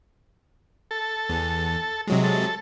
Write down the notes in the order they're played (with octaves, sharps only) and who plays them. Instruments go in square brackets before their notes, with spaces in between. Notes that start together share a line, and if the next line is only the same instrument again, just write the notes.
[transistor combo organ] A4
[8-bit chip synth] E2
C3 F#3 G#3
[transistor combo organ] A4